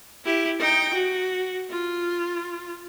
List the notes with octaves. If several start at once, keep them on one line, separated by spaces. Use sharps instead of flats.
E4 G4
D#4 G5
F#4
F4